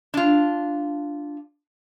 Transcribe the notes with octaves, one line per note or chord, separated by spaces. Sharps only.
D4 F4